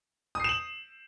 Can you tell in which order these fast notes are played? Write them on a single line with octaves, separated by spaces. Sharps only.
D#6 C7 E7 F#7